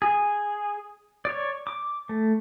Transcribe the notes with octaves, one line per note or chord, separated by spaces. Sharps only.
G#4
C#5 D5
D6
A3